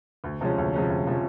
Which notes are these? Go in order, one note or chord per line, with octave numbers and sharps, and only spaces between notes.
D2
C3 F3 G#3 C#4
D2
C3 F3 G#3 C#4
D2
C3 F3 G#3 C#4